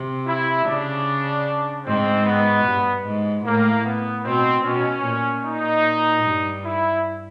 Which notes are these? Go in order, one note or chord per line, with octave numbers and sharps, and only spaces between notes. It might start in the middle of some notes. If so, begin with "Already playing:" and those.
Already playing: C3
E4
C#3 D4
G#2 C4
B3
G2
G#2
A2 A#3
B3
B2 C4
B2 C#4
A#2
D#4
G2
E4